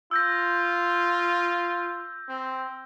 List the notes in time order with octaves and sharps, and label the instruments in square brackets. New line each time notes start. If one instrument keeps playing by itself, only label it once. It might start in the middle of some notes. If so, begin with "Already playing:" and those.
[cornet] F4 [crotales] E6 G6 A#6
[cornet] C4